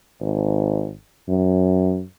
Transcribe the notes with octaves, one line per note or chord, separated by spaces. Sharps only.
G#1
F#2